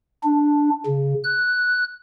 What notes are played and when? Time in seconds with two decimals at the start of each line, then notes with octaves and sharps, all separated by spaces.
0.23 D4
0.86 C#3
1.24 F#6